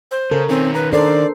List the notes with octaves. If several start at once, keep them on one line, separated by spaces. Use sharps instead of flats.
C5
C#3 A4 A#4
D#3 C4 C#4
B4 A#5
D4 A4 A#4 C5 D5 C7